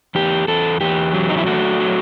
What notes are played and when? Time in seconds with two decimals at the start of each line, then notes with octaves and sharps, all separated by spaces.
0.15 E2 G4
0.48 E2 A4
0.81 E2 G4
1.13 F#3
1.29 D#4
1.38 E4
1.47 A3 F#4
1.79 F#3